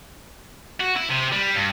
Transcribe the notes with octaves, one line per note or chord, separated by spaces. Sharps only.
F#4
E4
C3
G3
G2